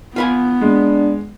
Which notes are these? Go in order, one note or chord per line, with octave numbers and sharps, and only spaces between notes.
B3 F4 B4 G#5
G#3 D4